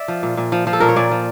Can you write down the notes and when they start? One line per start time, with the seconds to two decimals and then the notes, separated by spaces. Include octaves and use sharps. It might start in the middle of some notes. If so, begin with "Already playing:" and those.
Already playing: D5 E5
0.08 F3
0.23 A#2
0.37 A#2
0.52 F3
0.67 F3
0.73 A4
0.80 A#2 A#4
0.89 C#5
0.96 A#2 D5
1.11 F3